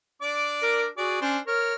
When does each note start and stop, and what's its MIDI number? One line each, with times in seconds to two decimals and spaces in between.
0.22 0.88 62
0.22 0.88 74
0.22 0.88 86
0.63 0.87 70
0.98 1.21 66
0.98 1.21 68
0.98 1.21 74
1.21 1.38 61
1.21 1.38 62
1.21 1.38 72
1.47 1.74 70
1.47 1.75 73
1.47 1.75 89